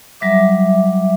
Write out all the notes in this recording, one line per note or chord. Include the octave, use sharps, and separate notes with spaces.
F#3 G3 E5 D6